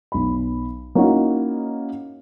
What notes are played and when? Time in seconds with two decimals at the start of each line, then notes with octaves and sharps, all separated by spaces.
0.12 B1 B5
0.95 A#3 C#4 D#4 E4 F#4